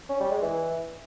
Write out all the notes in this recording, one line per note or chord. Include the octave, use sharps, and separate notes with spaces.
C#4
G3
G#3
E3